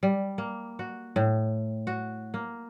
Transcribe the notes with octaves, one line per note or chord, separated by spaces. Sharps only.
G3
A#3
F#4
A2
F#4
A#3